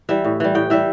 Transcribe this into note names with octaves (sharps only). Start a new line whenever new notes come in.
E3 G3 E5
A2
E3 G3
A2 G5
E3 G3 E5